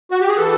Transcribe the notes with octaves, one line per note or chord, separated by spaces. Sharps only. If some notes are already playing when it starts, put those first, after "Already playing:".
F#4
G4
G#4
E3 A4